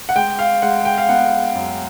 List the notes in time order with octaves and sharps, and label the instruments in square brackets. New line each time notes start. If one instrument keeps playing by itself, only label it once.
[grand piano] F#5
G#3 G5
F5
G#3 F#5
G5
F5
B3 F#5
F#2